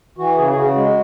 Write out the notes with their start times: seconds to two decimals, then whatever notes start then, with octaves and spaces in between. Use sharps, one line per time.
0.18 E3 F#4
0.37 C#3 G#4
0.49 G#4
0.56 C#3 F#4
0.75 G#3